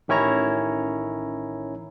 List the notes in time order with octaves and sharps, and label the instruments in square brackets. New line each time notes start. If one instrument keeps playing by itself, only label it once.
[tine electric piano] A1 D#3 C#4 E4 C#5 A#5